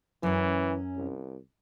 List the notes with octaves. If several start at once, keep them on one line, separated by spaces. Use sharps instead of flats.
F#2 E3 C#4
C2